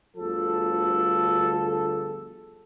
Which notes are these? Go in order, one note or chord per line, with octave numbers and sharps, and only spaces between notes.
G1 D2 F3 G#4 A4